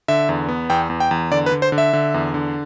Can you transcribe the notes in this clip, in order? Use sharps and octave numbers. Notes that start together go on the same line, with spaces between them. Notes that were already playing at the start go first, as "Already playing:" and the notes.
D3 E5
E2
B3
E2 G5
E2
G5
E2
D3 D5
B4
D3
C5
D3
E5
D3
E2
D3